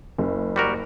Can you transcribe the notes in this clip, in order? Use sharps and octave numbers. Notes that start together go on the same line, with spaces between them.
F#1
G3 F#4 A#4